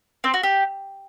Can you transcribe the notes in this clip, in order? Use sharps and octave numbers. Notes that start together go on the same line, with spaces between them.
C4
F#4
G4